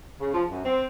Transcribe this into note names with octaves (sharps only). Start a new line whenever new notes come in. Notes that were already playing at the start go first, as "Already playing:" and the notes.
C#3
F3
F#2
C4